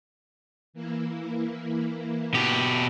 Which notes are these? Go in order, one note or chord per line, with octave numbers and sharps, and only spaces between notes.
E3 A#3 E4
B2 G4 G5 C#6